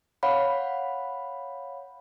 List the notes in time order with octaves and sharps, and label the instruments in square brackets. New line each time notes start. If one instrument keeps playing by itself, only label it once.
[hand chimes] C#5 F5 F#5 B5